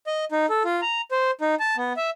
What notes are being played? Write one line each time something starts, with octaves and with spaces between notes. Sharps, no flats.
D#5
D#4
A4
F4
A#5
C5
D#4
A5
B3
E5